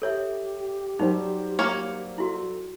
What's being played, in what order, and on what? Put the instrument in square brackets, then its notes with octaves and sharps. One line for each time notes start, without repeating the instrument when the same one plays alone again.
[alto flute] G4 [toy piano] A4 C#5 E5
[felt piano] F#3 G3 C5 [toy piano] D#4
[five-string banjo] A#3 C#5
[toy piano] E4 F#4 [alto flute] A4